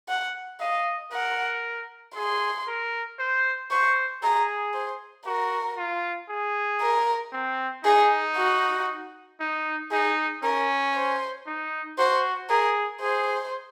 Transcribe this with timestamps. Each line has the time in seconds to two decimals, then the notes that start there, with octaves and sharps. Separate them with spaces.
0.09 F#5
0.61 D#5 F5
1.12 A#4 F#5
2.16 G#4 C6
2.67 A#4
3.19 C5
3.71 C5 C#6
4.23 G#4 A#5
4.74 C5
5.26 F#4 A#4
5.77 F4
6.29 G#4
6.81 A#4
7.33 C4
7.84 D#4 G#4
8.36 F#4
9.40 D#4
9.92 D#4 G#4
10.43 C#4 A#4
10.95 C5
11.46 D#4
11.98 F#4 C5
12.50 G#4 A#4
13.02 G#4 C5